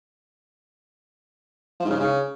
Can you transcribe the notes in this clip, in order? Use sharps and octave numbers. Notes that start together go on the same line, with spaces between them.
F3
G#2
C#3
G#2
C#3